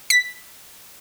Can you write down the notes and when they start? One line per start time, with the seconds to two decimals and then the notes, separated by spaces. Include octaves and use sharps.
0.10 B6